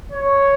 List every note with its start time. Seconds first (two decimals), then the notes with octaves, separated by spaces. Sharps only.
0.12 C#5